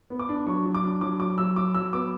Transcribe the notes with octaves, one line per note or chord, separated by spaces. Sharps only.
B3
D6
D4
F#3 C#6
F#3
D6
D4
F#3 D6
F#3 D6
F#3 E6
F#3 D6
F#3 E6
B3 D6